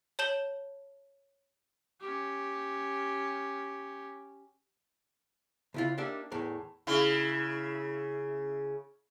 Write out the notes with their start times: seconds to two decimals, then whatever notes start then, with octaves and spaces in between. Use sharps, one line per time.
0.19 C#5 A5 G6 E7 F#7 G7
2.00 C#4 G4
5.74 C#2 E4 F4
5.98 A#3 D4 D#4 G4 D5 E5
6.32 E2 A2 A#4
6.87 C#3 E4